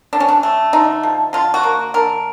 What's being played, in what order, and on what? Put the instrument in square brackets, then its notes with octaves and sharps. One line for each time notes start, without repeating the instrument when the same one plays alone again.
[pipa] D3 D4
C#4
D4
A3
D3 D#4
F3
D3 F4
F#4
A#3
D3 A#4